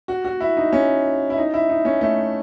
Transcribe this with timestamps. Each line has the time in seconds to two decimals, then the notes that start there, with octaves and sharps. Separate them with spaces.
0.08 F#4
0.25 F#4
0.40 E4
0.57 D#4
0.73 C#4
1.30 E4
1.38 D#4
1.54 E4
1.70 D#4
1.85 C#4
2.01 A3